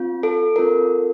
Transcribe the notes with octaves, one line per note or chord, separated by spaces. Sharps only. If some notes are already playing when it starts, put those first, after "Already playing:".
Already playing: C4 F4
A4
C4 F4 A4 A#4